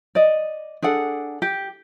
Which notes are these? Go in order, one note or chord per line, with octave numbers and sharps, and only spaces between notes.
D5 D#5
D4 G#4 A4 F#5
G4